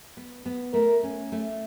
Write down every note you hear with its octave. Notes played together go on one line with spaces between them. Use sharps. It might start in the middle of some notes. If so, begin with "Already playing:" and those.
B3
B3
A3 A#4
C#4
A3